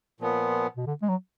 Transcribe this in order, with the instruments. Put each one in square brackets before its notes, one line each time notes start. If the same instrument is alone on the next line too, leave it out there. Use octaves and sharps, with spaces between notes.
[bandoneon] A#2 F3 B3
[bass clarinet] B2
D3
G#3
F#3